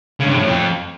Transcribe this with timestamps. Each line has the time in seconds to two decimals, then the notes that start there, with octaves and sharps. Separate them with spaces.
0.20 C#3
0.26 G2
0.32 C3
0.38 A2
0.44 F2